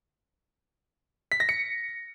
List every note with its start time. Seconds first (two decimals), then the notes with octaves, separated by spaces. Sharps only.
1.32 B6
1.40 A#6
1.49 C#7